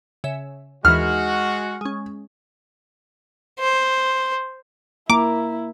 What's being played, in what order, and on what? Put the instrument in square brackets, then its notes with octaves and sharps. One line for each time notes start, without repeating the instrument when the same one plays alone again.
[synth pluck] C#3 E5
[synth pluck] D#2 E3 [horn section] G#3 F#4 [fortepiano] F6
[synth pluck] G#3 C#4
[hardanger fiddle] C5
[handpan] A#3 [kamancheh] E4 [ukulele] A#5 [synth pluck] D6